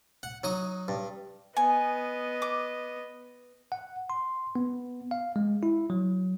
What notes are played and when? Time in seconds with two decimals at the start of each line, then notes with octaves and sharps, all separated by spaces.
0.23 F#5
0.44 F#3 D#4 D#6
0.88 G2
1.57 B3 D#5 G#5
2.42 D6
3.72 F#5
4.10 C6
4.56 B3
5.11 F5
5.36 G#3
5.63 E4
5.90 F#3